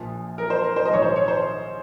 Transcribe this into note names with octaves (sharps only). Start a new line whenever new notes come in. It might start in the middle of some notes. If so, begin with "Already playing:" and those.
Already playing: A#1 A#2 F3
A#4
C5
A#4
C5
D#5
A#1 G#2 D#3 C#5
C5
C#5
C5